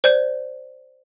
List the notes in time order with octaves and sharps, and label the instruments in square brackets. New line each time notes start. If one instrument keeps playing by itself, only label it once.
[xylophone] C5 D5 G6